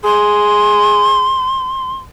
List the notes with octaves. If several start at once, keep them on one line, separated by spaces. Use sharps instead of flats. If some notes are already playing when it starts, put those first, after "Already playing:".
G#4 C6